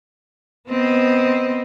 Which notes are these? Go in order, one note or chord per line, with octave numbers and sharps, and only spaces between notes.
B3 C4 D#5